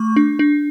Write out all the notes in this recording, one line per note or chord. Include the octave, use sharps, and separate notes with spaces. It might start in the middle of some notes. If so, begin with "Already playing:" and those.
Already playing: A3 C#6
D4
D4